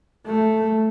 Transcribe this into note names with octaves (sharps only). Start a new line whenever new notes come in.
A3